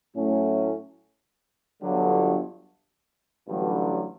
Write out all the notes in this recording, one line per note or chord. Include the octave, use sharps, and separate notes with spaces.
A2 F#3 A3 C#4
G1 G2 D3 F#3
A1 G2 D3 F#3